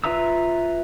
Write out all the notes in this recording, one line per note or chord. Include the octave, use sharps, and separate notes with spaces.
F4 B4 E5 A#5 E6